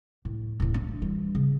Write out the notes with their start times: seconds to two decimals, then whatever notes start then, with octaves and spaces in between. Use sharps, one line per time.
0.25 A2
0.60 D#1 A2
0.74 D4
0.89 G#2
1.02 E3 G3
1.35 C#3